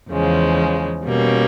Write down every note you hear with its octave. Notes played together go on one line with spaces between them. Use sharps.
E2 C#3 F3 G#3
B2 G3 A#3 C#4